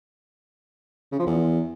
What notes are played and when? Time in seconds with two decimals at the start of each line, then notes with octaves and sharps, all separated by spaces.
1.12 C#3
1.19 F3
1.27 E2